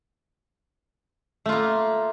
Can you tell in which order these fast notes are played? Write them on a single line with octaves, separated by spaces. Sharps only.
A3 F4 A#3